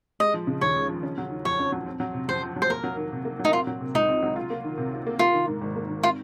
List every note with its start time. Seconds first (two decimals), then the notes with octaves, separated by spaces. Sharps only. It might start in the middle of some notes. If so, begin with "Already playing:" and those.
0.20 G#3 D#5
0.34 F3
0.47 C#3
0.61 D#2 C#5
0.76 G#3
0.89 F3
1.03 C#4
1.18 F#3
1.30 D#3
1.45 F2 C#5
1.59 C#4
1.72 F#3
1.86 C4
2.00 F#3
2.14 C3
2.28 F2 C5
2.42 C4
2.56 F#3
2.62 C5
2.70 A#3 A#4
2.84 F#3
2.97 D#3
3.12 C3
3.25 A#3
3.40 F#3
3.45 D#4
3.53 C4 F4
3.67 F#3
3.81 C3
3.94 C#2 D#4
4.08 C4
4.23 F#3
4.36 F4
4.50 A#3
4.64 D#3
4.78 C3
4.93 F4
5.07 A#3
5.19 A#3 F4
5.34 D#3
5.47 G#2
5.61 G#1
5.76 A#3
5.90 D#3
6.03 C4 F4